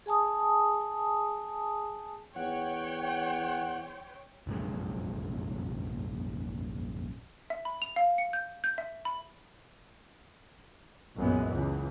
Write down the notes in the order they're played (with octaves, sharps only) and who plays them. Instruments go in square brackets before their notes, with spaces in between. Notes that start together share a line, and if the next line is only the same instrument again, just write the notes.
[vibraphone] G#4 G#5 A5 D#6
[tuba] E2 [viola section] C#5 G5 [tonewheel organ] F#5
[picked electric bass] F1 A#1 F#2 G#3
[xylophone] E5
B5
F7
F5
C#7
G6
G6
E5
B5
[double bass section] B1 F#2 A#2 E3 G#3 B3
C#2 E3